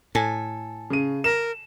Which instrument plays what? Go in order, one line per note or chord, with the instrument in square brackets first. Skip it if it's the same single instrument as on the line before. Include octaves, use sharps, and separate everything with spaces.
[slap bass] A2 [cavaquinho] A4 G#5
[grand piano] C#3 D#7
[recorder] A#4 [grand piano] E7